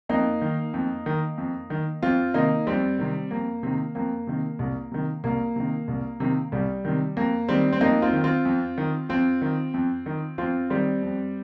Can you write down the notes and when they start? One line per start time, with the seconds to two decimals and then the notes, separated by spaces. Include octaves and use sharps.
0.09 F2 A#3 D#4
0.42 D#3
0.74 F2
1.06 D#3
1.38 F2
1.70 D#3
2.02 F2 C4 F4
2.34 C3 D#3 A#3 D#4
2.67 F2 G3 C4
2.99 C3 D#3
3.31 F2 A#3
3.63 C3 D#3
3.95 F2 A#3
4.27 C3 D#3
4.59 C2
4.92 C3 D#3
5.24 C2 A#3
5.56 C3 D#3
5.88 C2
6.20 C3 D#3
6.52 C2 G3
6.85 C3 D#3
7.16 F2 A#3
7.49 D#3 G3 C4
7.73 C4
7.81 F2 A#3 D#4
8.02 C4 F4
8.13 D#3
8.24 C4 F4
8.45 F2
8.78 D#3
9.09 F2 C4 F4
9.42 D#3
9.74 F2
10.06 D#3
10.38 F2 C4 F4
10.70 D#3 G3 C4
11.02 F2